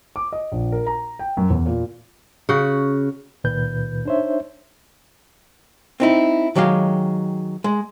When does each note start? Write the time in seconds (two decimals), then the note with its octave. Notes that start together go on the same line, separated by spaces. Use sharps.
0.16 D6
0.32 D#5
0.52 A#1
0.72 A#4
0.87 A#5
1.19 G5
1.37 F#2
1.50 E2
1.66 A#2
2.49 C#3 F#4
3.44 C#2 A#2 D#3 B4 G6
4.05 D4 D#4 C5 C#5 E5
6.00 C4 D#4 E4
6.55 D#3 F#3 G#3 G4 F5
7.64 G#3